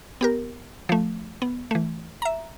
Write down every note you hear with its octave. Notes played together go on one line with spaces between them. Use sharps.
B3 G4 A#4
F3 A3
B3
E3 A3
E5 A#5